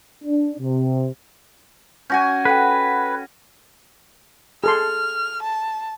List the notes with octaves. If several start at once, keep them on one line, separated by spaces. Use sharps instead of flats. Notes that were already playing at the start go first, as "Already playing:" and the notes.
D4
C3
C#4 F#4 G#5 G6
A4 B4 F#5 G5
G#4 A4 C6 F6
A5